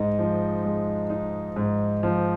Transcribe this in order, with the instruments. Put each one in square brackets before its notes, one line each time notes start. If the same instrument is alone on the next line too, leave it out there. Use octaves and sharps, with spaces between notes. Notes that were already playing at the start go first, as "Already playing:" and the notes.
Already playing: [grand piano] G#2 G#3 D#4
F3
G#3
D#4
G#2
F3